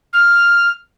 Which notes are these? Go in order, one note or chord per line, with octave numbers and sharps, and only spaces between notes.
F6